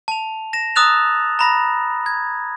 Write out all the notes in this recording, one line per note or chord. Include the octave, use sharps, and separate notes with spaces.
A5 F7
A#6 E7
A#5 D#6 E6 F#6 A6 F7
A#5 B5 A#6
G#6